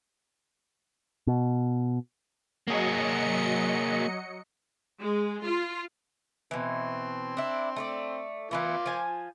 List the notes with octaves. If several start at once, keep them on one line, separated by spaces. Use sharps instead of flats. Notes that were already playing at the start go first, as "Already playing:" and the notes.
B2
F#3 A#3 G#4 D#5 C#7
G#3
F4
B2 E3 C4
D4 E4
A3 C#5 D5
E3 G#3 B3 F4 D6
F3 G#5